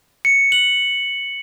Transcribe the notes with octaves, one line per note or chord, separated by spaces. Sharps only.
C#7
F#7